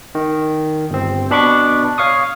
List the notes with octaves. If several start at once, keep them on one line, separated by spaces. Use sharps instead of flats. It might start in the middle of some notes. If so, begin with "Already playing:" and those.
D#3
G1 C4
B2 D4 B5 C#6 D6
C#5 F5 C#6 D#6